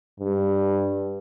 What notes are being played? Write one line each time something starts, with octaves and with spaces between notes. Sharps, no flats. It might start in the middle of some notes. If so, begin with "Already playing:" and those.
G2